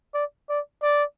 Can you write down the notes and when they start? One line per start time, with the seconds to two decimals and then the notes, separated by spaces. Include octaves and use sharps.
0.14 D5
0.49 D5
0.83 D5